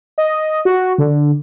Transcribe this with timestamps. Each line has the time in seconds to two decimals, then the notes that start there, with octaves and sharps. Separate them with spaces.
0.18 D#5
0.65 F#4
0.98 D3